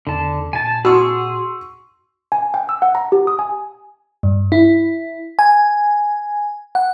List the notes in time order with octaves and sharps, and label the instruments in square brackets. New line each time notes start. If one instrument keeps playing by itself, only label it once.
[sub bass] E2 [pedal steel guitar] D3 A5
[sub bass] A#2 [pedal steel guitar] G#5 A5
[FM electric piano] F#4 [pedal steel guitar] G#4 [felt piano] C6 C#6 E6
[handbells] G#5
G5
E6
F#5
A#5
G4
D#6
G#5
[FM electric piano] G2
E4
G#5
F#5